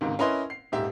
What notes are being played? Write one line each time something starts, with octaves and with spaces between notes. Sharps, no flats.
C#2 G#2 C3 D#3
C#4 E4 A#4 B4 D#5 C6
C7
D#1 G#2 G4 E5